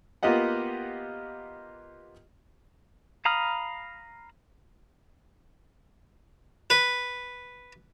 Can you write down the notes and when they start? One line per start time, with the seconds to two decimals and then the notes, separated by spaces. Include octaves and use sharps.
0.23 A#3 B3 F4 G4 D#5 F#5
3.25 F5 A#5 B5 D#6 F6
6.70 B4